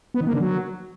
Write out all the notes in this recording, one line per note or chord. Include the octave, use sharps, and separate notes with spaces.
B3
D#3
A#3
D3
F#3